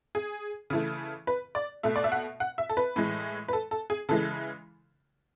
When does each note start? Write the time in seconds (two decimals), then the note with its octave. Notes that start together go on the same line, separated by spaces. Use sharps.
0.15 G#4
0.70 C#3 E3 A3
1.27 B4
1.55 D5
1.83 B2 A3 E5
1.96 D5
2.04 E5
2.12 F#5
2.40 F#5
2.58 E5
2.69 A4
2.77 B4
2.96 A2 E3 G#3
3.48 B4
3.53 A4
3.71 A4
3.90 G#4
4.09 C#3 E3 G#3 A4